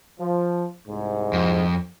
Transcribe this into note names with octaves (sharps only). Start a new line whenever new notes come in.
F3
C2 G#2
F2